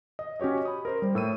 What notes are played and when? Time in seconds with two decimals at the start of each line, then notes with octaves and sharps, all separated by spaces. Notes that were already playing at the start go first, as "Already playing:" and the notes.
0.19 D#5
0.40 C#4 F#4 G4 C#5 D#5
0.65 B5 D#6
0.85 A#4 C5
1.02 G3
1.15 A2 E6 D#7